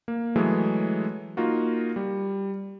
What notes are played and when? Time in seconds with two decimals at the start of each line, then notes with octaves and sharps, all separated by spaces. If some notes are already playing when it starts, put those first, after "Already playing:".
0.08 A#3
0.36 E3 F#3 G#3 A3 G#4
1.37 A#3 D#4 F4 F#4
1.96 G3